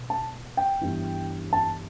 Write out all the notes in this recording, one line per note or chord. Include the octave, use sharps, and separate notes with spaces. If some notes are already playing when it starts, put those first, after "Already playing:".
Already playing: B2 B3
A5
G5
G2 E3 G3 B3
A5